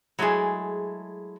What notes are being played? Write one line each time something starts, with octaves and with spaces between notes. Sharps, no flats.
F#3 G#3 A3 E4 G#4